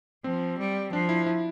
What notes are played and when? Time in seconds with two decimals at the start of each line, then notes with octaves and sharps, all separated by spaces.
0.24 F3 C4
0.59 G3
0.92 F3 D4
1.09 E4
1.26 E4